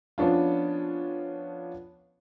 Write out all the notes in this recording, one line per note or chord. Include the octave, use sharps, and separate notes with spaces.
F3 B3 C#4 D4 F4